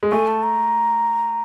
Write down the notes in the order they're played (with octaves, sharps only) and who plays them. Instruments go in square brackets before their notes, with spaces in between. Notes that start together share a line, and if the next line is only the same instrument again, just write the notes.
[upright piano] G#3
[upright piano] A3 [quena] G#5
[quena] A5
A#5